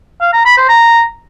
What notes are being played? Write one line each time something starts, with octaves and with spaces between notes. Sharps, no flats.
F5
A#5
B5
C5
A#5